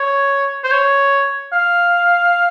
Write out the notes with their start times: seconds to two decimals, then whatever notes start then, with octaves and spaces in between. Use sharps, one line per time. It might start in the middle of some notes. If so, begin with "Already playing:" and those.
Already playing: C#5
0.64 C5
0.72 C#5
1.53 F5